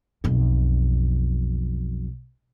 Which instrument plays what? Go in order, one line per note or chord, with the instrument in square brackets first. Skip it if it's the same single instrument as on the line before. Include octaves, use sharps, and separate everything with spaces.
[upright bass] B1 F2